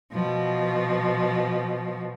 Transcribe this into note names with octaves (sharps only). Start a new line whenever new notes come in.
B2 F3